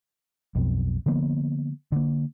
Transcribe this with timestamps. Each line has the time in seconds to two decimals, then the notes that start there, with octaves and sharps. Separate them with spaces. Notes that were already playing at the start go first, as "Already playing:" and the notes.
0.55 B1 F2 B2
1.06 D3 F3 A#3 B3
1.92 D3 A#3